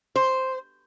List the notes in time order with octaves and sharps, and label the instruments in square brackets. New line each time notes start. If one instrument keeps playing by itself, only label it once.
[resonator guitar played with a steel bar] C5